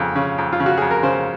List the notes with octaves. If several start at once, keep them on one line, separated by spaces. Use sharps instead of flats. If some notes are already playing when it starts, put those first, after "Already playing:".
Already playing: F2 C#3 G#4
C#3
F2
F4
C#3
F#4
F2 G#4
A#4
C#3 C5